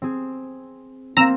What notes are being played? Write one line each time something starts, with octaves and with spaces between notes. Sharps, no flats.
C4 G#4
A#3 C4 A#5 E6